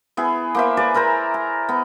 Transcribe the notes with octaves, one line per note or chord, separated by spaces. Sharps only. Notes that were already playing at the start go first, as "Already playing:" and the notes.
B3 E4 G#4
A#3 C5 E5
G#4 B4 D5
E4 A#4 C5 A#5
A#5
B3